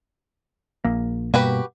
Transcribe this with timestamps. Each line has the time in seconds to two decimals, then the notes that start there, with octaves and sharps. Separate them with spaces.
0.84 A#1 A#3
1.34 G2 B2 A#3 F#4 G4 B4